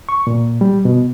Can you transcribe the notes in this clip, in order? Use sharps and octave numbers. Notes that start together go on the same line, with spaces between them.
C#6
A#2
G3
B2